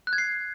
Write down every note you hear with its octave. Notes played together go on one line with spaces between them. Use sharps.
F#6
G#6
C7